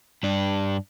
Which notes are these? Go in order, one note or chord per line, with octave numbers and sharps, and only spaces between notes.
G2 D4